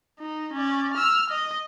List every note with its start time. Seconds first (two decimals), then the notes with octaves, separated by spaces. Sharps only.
0.19 D#4
0.53 C#4 D5
0.94 E6 F6
1.29 D#5